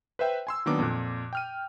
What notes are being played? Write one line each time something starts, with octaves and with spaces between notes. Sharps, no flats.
B4 C5 E5 G5
G#5 C6 E6
D#3 F#3 A#3 B3 D4 D6
F2 A#2 F#6
G5 F6 D#7